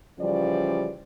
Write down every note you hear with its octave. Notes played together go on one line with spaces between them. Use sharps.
C#3 E3 F3 G3 C#4 D5